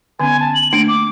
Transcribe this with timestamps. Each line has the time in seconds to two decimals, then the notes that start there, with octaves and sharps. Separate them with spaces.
0.20 D3 B3 C#4 G#5
0.40 A5
0.55 F#7
0.73 A3 A#3 D4 D7
0.88 D6